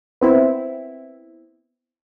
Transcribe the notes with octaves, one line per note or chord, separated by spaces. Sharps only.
B3 C4 E4